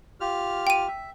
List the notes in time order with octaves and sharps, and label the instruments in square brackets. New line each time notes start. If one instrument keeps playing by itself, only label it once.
[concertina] F4 G4 F6
[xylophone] G5 D#7
[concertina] E5